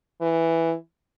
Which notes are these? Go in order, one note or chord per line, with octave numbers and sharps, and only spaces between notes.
E3